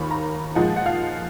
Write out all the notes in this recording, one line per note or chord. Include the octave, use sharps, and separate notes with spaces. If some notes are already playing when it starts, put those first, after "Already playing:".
Already playing: D#2 D#3 A#3 F4 B5 C#6
A#5
A#2 F3 G#3 D#4 F#5
F#5
F5